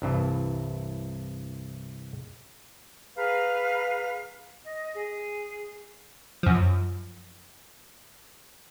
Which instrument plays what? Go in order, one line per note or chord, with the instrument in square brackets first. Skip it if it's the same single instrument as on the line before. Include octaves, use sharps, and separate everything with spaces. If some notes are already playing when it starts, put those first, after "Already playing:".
[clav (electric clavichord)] C2 G2 E3
[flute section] G#4 B4 F5 A#5
D#5
G#4
[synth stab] F#2 F3